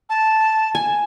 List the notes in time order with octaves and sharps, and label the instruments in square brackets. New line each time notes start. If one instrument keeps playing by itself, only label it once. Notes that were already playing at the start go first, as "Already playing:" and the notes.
[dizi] A5
[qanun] G#5